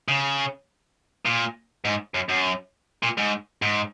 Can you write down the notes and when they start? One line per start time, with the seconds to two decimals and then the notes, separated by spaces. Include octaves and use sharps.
0.08 C#3
1.26 A#2
1.85 G#2
2.14 F#2
2.29 F#2
3.03 A#2
3.18 G#2
3.62 G#2